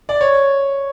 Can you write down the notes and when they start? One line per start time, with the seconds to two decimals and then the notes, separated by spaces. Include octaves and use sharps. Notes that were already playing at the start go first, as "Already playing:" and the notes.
0.09 D5
0.21 C#5